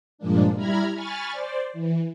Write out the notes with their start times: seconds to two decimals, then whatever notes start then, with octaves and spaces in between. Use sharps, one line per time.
0.18 G2 A#2 F3 G#3 A#3 D4
0.55 G3 E4 A#5 B5 F6 G#6
0.94 G#5 B5 C#6 F6 A6
1.32 C5 D5
1.73 E3